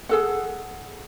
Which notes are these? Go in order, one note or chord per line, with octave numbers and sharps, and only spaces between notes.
G#4 A4 F#5